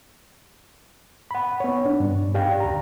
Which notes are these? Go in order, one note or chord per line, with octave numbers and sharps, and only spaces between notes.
F#5 B5
B3 C#5
D4
G2
G4 D5 F5 G5
D2 A#5